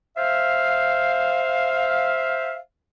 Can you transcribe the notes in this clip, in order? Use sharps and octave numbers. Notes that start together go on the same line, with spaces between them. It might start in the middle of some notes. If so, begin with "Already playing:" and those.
C5 E5 F5